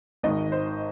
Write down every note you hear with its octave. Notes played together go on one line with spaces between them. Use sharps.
G#1 G#2 D#3 D#5
C5